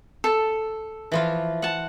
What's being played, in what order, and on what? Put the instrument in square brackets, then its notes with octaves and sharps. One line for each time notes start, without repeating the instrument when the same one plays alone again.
[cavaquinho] A4
[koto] E3 F3 F4
F#5 A5